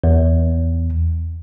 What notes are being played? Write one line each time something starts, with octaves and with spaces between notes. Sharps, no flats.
E2